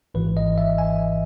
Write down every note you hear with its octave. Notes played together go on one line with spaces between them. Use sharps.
G#1 G#2 E3 B4
D#5
E5
G#5